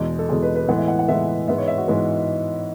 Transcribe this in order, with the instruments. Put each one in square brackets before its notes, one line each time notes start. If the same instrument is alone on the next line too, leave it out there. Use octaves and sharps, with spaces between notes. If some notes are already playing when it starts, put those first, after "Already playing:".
Already playing: [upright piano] E2 B2 G#3
A4
E2 B2 G#3 G#4
B4
B4
A2 E3 G#3 B3 F#5
E5
F#5
F#5
A2 E3 G#3 B3 E5
G#2 E3 G#3 B3 E5
C#5
E5
F#4
G#2 E3 G#3 B3